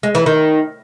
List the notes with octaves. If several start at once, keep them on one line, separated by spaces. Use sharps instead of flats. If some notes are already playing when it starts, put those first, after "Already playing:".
G#3
E3
D#3